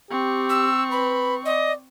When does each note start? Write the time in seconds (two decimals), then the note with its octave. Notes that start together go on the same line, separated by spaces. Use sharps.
0.11 C4 G4 C#6
0.49 E6
0.91 B4 B5
1.45 D5 D#5